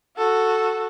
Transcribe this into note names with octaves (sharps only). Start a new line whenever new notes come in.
F#4 A4